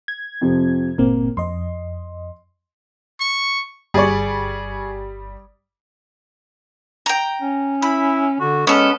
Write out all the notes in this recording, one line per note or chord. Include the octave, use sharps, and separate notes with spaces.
G#6
F2 C3 F3
G1 A#2 A#3 C4
F2 D#5 C6
C#6
G1 G3 G#4 D5 C#6
G5 A#5
C#4
E4 B5
D3 F#4
G#3 B3 C#4 A4